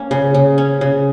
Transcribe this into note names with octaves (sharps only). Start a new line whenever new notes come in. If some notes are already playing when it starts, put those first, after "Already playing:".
Already playing: A#3 C#4
C#3
C#3
C#4
C#3